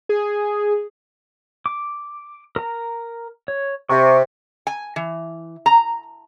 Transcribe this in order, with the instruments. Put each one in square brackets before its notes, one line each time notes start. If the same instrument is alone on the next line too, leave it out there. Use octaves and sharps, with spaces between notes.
[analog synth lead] G#4
[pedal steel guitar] D6
A#4 A#5
C#5
[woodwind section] C3 [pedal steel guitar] C#6
[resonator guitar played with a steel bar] G#5
E3
A#5